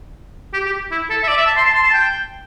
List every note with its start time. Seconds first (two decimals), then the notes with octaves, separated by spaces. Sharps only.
0.53 G4
0.66 G4
0.91 E4
1.10 A4
1.23 E5
1.28 D5
1.37 E5
1.46 A5
1.56 C6
1.65 A5
1.75 C6
1.83 A5
1.93 G5